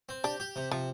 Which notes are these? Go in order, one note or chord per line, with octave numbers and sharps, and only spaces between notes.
C4
D4 G4
G4
C3
C3 F3